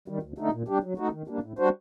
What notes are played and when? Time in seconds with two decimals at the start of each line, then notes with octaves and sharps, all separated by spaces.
0.08 D#3 G3
0.23 D2
0.38 D3 A3 D#4
0.53 A#2
0.68 G3 D4 G4
0.83 F#3
0.98 A3 D#4 F#4
1.12 D#3
1.28 G3 A#3 D4
1.43 A2
1.59 G3 D4 F#4 C5